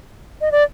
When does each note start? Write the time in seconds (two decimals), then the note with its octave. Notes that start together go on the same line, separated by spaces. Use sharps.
0.41 D#5
0.52 D5